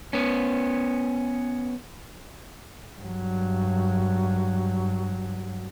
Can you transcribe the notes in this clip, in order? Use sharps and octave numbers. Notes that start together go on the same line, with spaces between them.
B3 C#4
G2 F#3